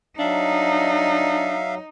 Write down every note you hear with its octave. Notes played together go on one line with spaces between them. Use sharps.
F#3 D4 D#4 E5 F5